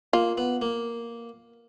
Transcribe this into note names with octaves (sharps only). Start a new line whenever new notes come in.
A#3 F4
B3
A#3